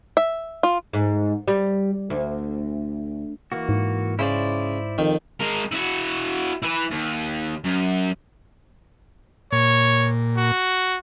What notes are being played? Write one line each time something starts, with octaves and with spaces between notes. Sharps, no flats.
E5
F4
G#2
G3
D2
E3 A#3 F#4
G#2
C#3 E4 C5 D5
F2 D#3
G#3 A#4
E4 F#4
E4 B4
D#2
F#2
A#2 C#5
F#4